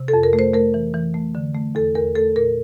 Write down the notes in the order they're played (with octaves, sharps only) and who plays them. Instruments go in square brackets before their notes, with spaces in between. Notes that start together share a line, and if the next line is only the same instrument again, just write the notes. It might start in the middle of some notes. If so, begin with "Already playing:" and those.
Already playing: [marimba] C3
A4
F2
A#4
A3
C5
A3 A#4
E3
E3
A3
D3
A3
E2 A4
E2 A#4
A3 A4
A#2 A#4